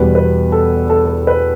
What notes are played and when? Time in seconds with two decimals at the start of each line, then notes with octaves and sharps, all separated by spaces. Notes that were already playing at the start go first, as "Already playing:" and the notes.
Already playing: E2 B2 G3 B4
0.15 B4
0.52 A4
0.90 A4
1.05 A4
1.27 B4